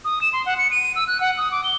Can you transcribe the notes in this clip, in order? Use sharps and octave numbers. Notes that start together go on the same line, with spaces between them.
D#6
E7
C6
F#5
C#7
D#7
E6
F#6
F#5
D#6
D6
G7